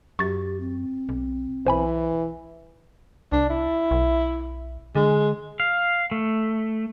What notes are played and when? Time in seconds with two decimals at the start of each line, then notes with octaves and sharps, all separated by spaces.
0.19 F#2 G4 C#6 A6
0.60 C4
1.09 B1
1.66 B1 E3 C5 G#5 B5
3.32 C2 D4
3.49 E4
3.91 B1
4.95 D3 G#3
5.60 F5
6.11 A3